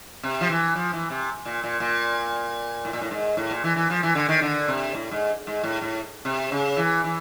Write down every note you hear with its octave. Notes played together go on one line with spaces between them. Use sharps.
C3
F3
E3
F3
E3
C3
A#2
A#2
A#2
A2
A#2
A2
G#2
A2
A#2
E3
E3
F3
E3
D3
D#3
D3
C3
A2
G#2
G#2
A2
A2
C3
C#3
E3
E3